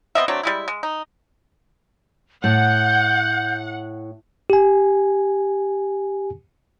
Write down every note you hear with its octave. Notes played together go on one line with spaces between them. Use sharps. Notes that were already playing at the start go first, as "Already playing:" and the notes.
B3 C4 D#5 E5
F#3 A3 C4 D4
G3 G#3 E4
G#3
D#4
A2 F#5 G6
G4 G#5